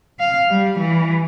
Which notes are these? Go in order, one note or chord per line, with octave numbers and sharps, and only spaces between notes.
F5
G3
E3